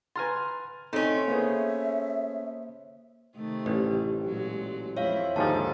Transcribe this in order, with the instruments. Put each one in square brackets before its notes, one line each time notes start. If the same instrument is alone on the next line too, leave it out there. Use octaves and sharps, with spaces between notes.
[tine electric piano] B4 F6 A6 [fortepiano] G#5 A#5 C6
[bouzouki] A3 C#4 [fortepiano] C4 [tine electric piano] D#4 D#5 C6
[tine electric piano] A#3 C5 [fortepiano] B3 G#4 [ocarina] E5
[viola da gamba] C3 D#3 A3
[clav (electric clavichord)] A1 [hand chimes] G4
[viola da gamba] A#2 F#3 G#3
[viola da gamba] F2 E4 [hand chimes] C#5 E5 F5
[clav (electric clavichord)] D#2 G#2 F3 [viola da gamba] D3 D#3 A4 [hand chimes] A5